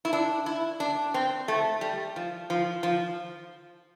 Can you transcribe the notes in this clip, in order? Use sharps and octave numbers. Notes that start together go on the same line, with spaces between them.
E4
D4
E4
D4
C4
A3
G3
F3
F3
F3